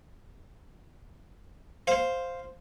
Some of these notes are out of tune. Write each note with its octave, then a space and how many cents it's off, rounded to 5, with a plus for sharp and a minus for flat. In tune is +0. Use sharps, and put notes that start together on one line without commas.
C5 +0 F5 +0